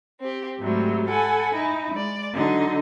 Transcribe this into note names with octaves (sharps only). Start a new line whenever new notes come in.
C4 G4
G#2 C3 F#3 G3 A3
A4 F#5 G#5 B5
D#4 E4
G#3 D5
D3 F#3 D#4